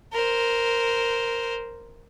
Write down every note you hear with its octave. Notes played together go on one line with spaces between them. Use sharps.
A#4 C5